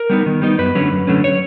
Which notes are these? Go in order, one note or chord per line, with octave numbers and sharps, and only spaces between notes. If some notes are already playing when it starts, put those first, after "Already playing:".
Already playing: A#4
G3 B3 D#4
D#3
G3 B3 D#4
F#2 B4
D3 F#3 A3 C#4
F#2
D3 F#3 A3 C#4
C#5